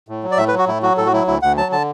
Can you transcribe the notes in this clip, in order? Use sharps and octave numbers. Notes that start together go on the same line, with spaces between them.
A2
F#3
D5
A2 E5
B4
F#3 F#4
A2 E4
F#3 F#4
A2 A4
F#4
F#3 E4
D2 E4
D2 F#5
F#3 A5
D3 A5